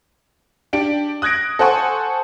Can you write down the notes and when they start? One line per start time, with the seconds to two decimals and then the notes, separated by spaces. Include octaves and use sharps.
0.73 D4 G4 D7
1.22 D#6 F#6 G#6 A#6 D7
1.59 A4 C5 F#5 G#5 C#6